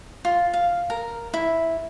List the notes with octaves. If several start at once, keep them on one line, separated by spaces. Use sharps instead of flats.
F4
F5
A#4
E4